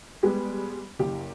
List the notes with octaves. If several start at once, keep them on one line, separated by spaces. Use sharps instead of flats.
G3 G#3 B3 G4
F#1 G4